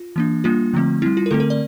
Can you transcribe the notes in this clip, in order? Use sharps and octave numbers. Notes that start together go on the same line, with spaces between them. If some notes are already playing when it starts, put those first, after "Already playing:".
Already playing: F4
E3 A#3 D4
G3 A#3 D4 F4
D3 F3 A3 C4
G3 C4 E4
F4
A#4
D3 A3 C4 A4
A#4
D5